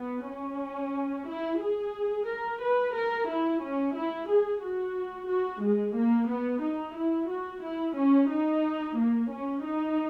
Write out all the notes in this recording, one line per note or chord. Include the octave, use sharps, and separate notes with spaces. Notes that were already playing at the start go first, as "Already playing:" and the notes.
Already playing: B3
C#4
E4
G#4
A#4
B4
A#4
E4
C#4
E4
G#4
F#4
F#4
G#3
A#3
B3
D#4
E4
F#4
E4
C#4
D#4
A#3
C#4
D#4